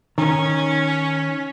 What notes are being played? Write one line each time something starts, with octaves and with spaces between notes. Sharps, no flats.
D#3 C#4